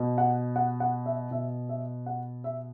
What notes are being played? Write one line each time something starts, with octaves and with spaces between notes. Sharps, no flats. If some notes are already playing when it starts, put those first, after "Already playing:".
Already playing: B2
F#5
F#5
F#5
E5
B2 E5
E5
F#5
E5